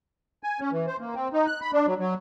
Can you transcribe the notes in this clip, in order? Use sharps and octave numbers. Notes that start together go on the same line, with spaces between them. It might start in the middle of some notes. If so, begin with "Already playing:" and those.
G#5
C#4
E3
C5
A#3
C4
D#4
F#6
B5
D4
F#3
F#3